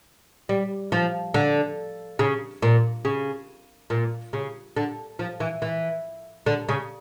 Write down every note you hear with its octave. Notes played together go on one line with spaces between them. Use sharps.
G3
F3
D3
C#3
A#2
C#3
A#2
C#3
D3
F3
E3
E3
D3
C#3